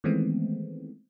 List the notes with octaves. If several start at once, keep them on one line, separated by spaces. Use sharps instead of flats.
D#3 E3 G#3 A3 B3 C4